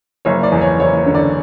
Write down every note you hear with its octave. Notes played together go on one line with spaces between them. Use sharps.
F#1 C#5
D5
E2
C#5
F#1 C#5
D3
D5